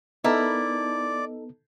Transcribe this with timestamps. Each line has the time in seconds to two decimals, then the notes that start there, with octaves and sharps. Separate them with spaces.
0.24 B3 D#4 E4 A4 A#4 D5